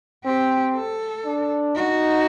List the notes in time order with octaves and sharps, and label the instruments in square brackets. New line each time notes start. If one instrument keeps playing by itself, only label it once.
[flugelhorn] C4 [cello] G4
[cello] A4
[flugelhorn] D4
[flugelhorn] D#4 [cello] F#4